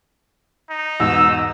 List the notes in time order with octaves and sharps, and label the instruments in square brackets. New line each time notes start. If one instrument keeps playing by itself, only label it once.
[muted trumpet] D#4
[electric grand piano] E2 B2 [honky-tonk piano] G#2 [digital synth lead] E6